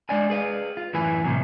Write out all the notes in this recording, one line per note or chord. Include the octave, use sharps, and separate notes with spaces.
G#3 D4 D5 G#5
G#4 B4 F5
F4
F#2 A2 E3 E4 B4 G#5
A2 C3 F#3